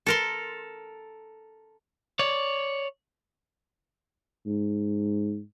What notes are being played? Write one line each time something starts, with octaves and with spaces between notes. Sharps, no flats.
A4 A#4 C6
C#5 D5
G#2